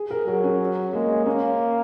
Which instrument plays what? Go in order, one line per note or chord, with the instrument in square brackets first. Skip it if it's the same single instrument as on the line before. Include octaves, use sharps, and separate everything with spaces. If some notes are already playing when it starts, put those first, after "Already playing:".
Already playing: [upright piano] G#4
A#4
[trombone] F#3 [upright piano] A#4
[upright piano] C#4
[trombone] G#3 [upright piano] A#3
[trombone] A#3 [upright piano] C#4